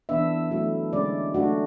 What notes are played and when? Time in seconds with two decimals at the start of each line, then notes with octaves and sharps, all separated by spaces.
0.09 E3 B3 D4 E5
0.51 F#3 A3 E4
0.93 D3 G#3 C#4 D5
1.34 F#3 A3 D4 F#4